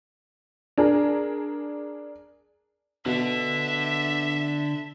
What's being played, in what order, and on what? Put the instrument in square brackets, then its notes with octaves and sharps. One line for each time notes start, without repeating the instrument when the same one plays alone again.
[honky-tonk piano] D4 G#4 A#4
[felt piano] B2 [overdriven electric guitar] D3 [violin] E5